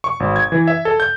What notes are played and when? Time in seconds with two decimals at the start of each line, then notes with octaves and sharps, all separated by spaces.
0.04 C#6
0.20 G#1
0.36 G#6
0.52 E3
0.68 E5
0.85 A4
1.00 G6